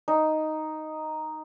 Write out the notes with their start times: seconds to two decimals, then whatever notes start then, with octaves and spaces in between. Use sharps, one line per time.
0.08 D#4